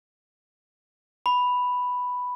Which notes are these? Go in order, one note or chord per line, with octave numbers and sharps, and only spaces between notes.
B5